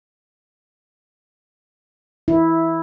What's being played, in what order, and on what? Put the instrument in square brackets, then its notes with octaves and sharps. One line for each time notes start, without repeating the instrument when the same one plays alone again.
[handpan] E4